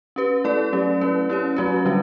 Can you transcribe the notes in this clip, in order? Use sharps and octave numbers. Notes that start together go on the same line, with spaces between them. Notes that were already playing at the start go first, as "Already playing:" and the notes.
C#4 G4 B4
A3 E4 A4 D5
F#3 A3 C#4 G4
A3 C#4 E4 B4
C#4 E4 G4 C#5
F#3 A3 C#4 F#4 B4
D3 G3 D4 F#4